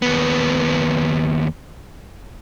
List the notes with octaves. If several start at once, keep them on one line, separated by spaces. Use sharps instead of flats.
D#2 B3